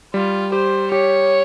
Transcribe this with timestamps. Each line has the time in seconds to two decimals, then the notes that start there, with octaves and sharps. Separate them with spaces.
0.14 G3 F4
0.52 G4 C5
0.91 G4 C#5